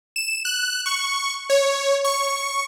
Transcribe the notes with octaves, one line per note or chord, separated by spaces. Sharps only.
E7
F#6
C#6
C#5
C#6